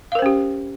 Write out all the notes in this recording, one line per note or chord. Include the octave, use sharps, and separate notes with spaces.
C#4 G4 A#4 C5 F5